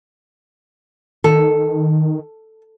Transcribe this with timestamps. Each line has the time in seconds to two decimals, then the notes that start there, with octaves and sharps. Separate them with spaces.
1.24 D#3 A4